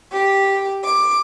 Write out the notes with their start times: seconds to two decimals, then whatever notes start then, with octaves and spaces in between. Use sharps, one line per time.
0.14 G4
0.84 D6